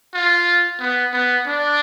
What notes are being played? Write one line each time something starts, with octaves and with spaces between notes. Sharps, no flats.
F4
B3
B3
D4